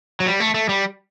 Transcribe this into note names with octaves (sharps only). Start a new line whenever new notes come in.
F#3
G3
A3
A3
G3